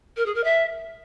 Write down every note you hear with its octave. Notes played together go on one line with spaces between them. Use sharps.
A#4
G#4
A#4
E5